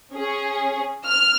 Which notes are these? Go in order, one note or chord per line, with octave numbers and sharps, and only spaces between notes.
C#4 G#4
F6